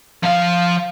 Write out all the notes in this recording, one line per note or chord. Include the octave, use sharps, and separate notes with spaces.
F3 F5